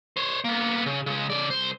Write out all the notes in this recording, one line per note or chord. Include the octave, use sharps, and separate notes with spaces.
C5 C#5
A#3 B3
C#3
C#3 G#3
C#3 D5
C2 C5